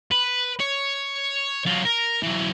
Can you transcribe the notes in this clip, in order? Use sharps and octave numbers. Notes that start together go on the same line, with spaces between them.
B4
C#5
F#3 F4
A#4
E3 F#3